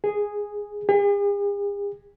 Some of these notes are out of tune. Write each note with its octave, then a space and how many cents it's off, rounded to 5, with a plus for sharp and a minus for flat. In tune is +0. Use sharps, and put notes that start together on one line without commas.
G#4 -5
G#4 -45